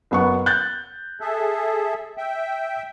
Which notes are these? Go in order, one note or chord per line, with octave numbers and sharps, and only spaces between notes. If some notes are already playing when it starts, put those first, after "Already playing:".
F#1 B3 C#6
F#6 G6 A6
G#4 A4 E5
E5 G5